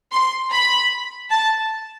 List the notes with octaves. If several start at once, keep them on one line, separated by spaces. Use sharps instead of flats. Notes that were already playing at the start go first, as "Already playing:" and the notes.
C6
B5
A5